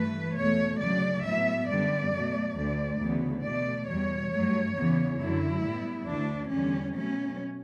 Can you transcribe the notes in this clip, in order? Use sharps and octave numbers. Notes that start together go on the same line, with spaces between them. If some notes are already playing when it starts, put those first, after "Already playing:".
Already playing: G2 E3 A3 B4
E2 B2 A3 C#5
D2 C#3 F#3 D5
A2 F#3 B3 E5
F#2 D3 G3 B3 D5
B2 F#3 A3
D2 D3 A3 D5
D2 C#3 E3 B3
B2 A3 D5
E2 B2 G3 C#5
G2 F#3 A3
E2 C#3 E3 B3
F#2 D3 F#3 E4
A2 G3 B3
D2 D3 A3 D4
E2 D3 G3 C#4
B2 F#3 A3 C#4